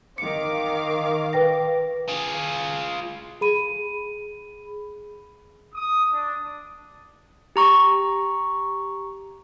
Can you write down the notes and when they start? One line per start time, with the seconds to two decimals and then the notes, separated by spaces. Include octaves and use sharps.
0.18 D#3 F5 D6 C#7
1.33 B4 G5 A#6
2.08 F4 G#4
3.41 G#4 B5 D#7
5.74 D#6
6.12 D4
7.56 G4 A#5 C#6